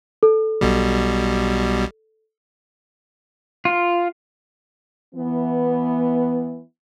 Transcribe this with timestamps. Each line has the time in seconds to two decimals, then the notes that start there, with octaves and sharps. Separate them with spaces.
0.23 A4
0.61 B1 B2 G3
3.65 F4
5.15 E3 B3